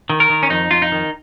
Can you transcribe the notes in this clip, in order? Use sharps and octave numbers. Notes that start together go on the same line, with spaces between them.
D#3
A#4
D#3
C#4
F2 D#4
F2 F4
D#4
D#3